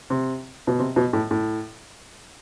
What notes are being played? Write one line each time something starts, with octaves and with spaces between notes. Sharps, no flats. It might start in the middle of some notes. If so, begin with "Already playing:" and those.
C3
B2
C3
B2
A2
A2